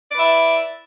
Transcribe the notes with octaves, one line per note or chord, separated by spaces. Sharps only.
E4 B4 D5 E5